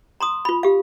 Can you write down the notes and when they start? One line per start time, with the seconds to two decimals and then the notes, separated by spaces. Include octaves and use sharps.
0.20 A#5 C6 D#6
0.45 F4 B5
0.63 G4 F5